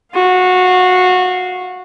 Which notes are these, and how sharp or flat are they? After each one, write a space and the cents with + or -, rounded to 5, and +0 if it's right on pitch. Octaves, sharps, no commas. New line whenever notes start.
F#4 -20 F5 +0